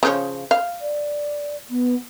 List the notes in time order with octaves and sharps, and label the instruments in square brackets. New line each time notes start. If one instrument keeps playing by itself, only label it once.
[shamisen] C#3 F3 C#5
F5
[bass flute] D5
B3